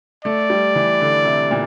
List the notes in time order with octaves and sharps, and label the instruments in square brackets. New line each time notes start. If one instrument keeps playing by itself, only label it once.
[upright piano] A3 [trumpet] D5
[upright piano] G3
E3
D3
C3
A#2